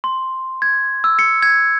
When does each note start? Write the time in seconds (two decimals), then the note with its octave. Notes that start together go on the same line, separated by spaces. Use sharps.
0.04 C6
0.62 G#6
1.04 E6
1.19 C#7
1.42 G#6